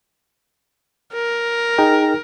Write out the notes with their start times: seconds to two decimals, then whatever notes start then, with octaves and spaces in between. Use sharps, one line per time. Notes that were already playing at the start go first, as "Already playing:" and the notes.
1.14 A#4
1.78 D#4 G#4 G5